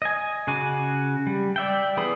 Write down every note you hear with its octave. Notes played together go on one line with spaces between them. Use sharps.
D#5 G#5
C#3 F#4 G#5 D6
G3
D5 E5 G5
E3 B3 G#4 B5 D#6